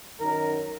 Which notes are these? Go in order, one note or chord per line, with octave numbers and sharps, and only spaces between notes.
F#2 D#3 F#3 A#4